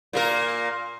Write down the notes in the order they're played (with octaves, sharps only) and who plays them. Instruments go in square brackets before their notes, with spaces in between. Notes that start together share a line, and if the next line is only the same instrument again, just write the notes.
[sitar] A#2 A#3 A#4